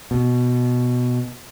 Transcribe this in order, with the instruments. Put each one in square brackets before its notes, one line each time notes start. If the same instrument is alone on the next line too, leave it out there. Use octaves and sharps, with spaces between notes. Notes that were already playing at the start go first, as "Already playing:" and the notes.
[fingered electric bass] B2